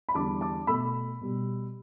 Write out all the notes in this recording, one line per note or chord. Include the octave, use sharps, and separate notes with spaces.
B5
E2 D3 G3 A5 D6
A5 D6
B2 A3 B5 E6
B2 G3